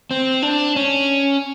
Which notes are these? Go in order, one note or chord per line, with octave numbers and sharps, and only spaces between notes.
C4
D4
C#4